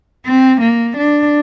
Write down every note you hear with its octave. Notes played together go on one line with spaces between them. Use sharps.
C4
A#3
D4